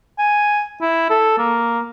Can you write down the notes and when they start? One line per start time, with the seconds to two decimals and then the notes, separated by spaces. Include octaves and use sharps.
0.19 G#5
0.81 E4
1.10 A4
1.38 A#3